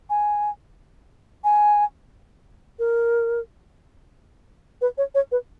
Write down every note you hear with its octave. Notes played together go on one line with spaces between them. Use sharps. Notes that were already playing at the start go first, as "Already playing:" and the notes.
G#5
G#5
A#4
B4
C#5
C#5
B4